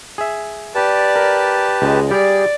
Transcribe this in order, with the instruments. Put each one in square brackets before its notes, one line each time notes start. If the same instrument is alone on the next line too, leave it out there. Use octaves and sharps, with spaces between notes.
[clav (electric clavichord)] G#4 E5
[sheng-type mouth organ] G4 B4 A5 [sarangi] D5
[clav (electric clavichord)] A#4
[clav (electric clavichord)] C#2 [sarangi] G#3
[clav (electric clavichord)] G3 G4 [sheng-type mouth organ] G#4 [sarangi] D5